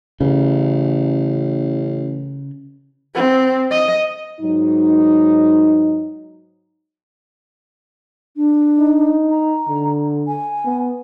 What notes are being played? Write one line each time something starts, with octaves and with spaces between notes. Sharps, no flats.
A1 C#3
C4
D#5
G#2 F#3 D#4
D4
D#4
A#5
D3
G#5
B3